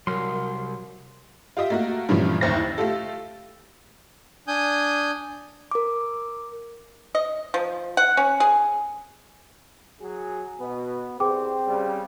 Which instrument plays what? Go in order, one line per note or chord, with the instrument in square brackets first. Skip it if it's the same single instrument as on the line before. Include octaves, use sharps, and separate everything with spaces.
[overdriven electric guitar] C2 [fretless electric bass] F#3 [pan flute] A#4 [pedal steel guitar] C6 F6
[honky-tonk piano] F4 G4 D#5 E5
A3 A#3 F#4
G2 A#2 C#3 E3 F3 A3
F#1 D#2 C5 A6 A#6
E4
A3 F4 G4 A4
[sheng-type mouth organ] D4 G#5 D#6 G6
[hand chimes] A#4 D6
[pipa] D#5
F3
F#5
C#4
G#4
[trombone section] F#3 G#4
[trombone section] B2 [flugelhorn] B3
[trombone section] C2 [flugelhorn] C4 [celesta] G#4 G5 D6
[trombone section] C#3 G3